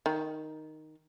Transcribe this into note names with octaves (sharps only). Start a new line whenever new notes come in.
D#3